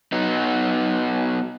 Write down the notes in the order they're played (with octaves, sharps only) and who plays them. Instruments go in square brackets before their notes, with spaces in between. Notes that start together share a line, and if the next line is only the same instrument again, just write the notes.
[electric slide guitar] F#3 B3 D#4